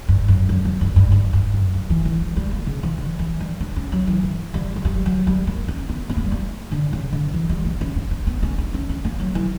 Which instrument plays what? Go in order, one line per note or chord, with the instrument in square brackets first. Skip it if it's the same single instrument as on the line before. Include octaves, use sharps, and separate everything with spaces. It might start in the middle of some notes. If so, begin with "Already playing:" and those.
[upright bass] G2
F#2
F#2
E2
G2
G2
G2
G2
F#2
G2
E3
E3
G3
G3
A#3
C#3
E3
D3
E3
G3
D4
C#4
F#3
E3
E3
G3
F#3
G3
F#3
G3
A#3
C#4
B3
B3
A#3
G3
A#3
D3
C#3
D3
E3
G3
A#3
C#4
C#4
D4
B3
C#4
D4
C#4
C#4
A#3
F#3
E3